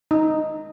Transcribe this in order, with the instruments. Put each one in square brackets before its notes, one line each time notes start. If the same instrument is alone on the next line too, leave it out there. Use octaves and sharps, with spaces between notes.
[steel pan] D#4